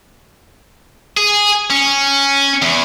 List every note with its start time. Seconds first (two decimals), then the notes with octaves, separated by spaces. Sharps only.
1.17 G#4
1.70 C#4
2.62 E2